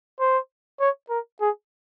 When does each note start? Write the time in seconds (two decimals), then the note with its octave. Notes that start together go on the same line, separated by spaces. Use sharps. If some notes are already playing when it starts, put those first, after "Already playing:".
0.20 C5
0.81 C#5
1.10 A#4
1.41 G#4